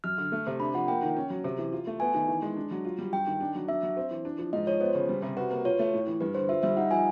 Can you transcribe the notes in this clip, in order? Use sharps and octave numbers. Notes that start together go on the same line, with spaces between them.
F#2 F6
D3
A3
C3
D4 B5
F3 F#5
A#3 G5
D#3
C#4
F#3
C3
E3
F4
A3
B3 G#5
D#3
E3
G#3
D4
F#3
F4
G3
G2 G5
D#3
D4
F#3
D4 E5
F#3
C4
E3
D4
F3
G#2 D#5
F3 C#5
B3 C5
C#3
G3
C3
F#4 B4
A#3 B4
F4 C#5
A3
A2
E3
G2 B4
D3 C5
F4 E5
G3 E5
D#4 F#5
F3 G#5